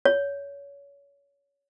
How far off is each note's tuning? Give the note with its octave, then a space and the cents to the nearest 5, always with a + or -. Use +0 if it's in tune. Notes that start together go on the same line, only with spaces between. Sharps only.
C#5 +25